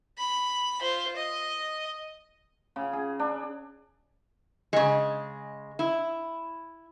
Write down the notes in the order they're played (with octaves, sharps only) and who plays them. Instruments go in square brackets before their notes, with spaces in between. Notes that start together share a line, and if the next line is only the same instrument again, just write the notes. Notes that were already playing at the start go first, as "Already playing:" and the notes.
[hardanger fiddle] B5
F4 C5
D#5
[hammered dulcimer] C#3
G#4
D4
[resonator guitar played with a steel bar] C#3 G#3
E4